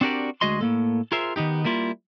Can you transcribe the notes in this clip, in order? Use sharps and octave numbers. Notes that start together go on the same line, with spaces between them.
C4 D4 F#4 G4 A#4 D5
D2 G#3 F#4 G#4 D#5 C6
A2 A#3 A4
F4 G#4 A#4 C5 E5
D#3 B3 D#4 G4
G3 A#3 E4 F4